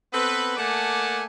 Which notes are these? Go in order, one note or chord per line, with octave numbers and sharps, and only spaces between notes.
B3 C4 A4 B4
A3 A#3 D5 F#5 G#5 A5